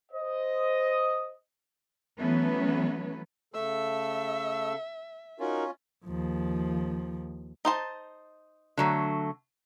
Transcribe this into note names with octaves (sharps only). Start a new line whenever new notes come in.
C5 D#5
E3 F#3 A3 B3 C#4 B4
C#3 A3 A4 E5 E6
C#4 D#4 F4 F#4 A#4
D#2 F3
D#4 C5 A5
D3 F#3 A3